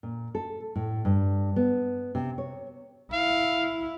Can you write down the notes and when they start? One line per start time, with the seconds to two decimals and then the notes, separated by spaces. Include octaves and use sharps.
0.03 A#2
0.35 A4
0.76 A2
1.05 G2
1.56 B3
2.15 C3
2.38 C#5
3.13 E4 F5